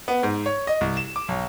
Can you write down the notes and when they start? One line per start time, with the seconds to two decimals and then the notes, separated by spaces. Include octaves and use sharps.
0.08 B3
0.23 G#2
0.46 C#5
0.67 D#5
0.81 C2
0.97 E7
1.16 D6
1.28 B1